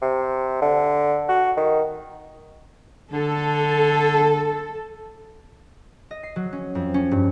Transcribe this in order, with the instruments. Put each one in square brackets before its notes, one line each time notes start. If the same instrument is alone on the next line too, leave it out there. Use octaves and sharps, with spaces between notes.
[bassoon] C3
D3
F#4
D#3
[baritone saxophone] D3 [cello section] A4
[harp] D#5
C7
F#3
C#4
F2
C#4
G2